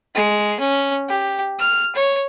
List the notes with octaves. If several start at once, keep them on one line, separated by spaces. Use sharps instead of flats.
G#3
C#4
G4
F6
C#5